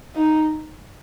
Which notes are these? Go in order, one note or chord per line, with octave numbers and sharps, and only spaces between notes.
D#4